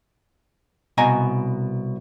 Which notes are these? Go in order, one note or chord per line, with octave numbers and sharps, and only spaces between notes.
C2 B2 D#5 G#5 A#5